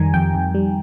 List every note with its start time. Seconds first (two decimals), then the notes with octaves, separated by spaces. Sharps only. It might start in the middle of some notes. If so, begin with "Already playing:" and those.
Already playing: F2 D#3 G3 G#5 A#5
0.14 F2 G5
0.34 F2
0.55 G3